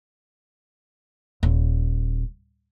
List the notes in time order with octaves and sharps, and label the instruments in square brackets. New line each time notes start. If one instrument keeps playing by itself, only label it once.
[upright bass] D#1